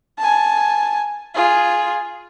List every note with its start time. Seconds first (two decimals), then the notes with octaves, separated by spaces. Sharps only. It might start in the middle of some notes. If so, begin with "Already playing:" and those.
0.19 G#5 A5
1.35 F4 G#4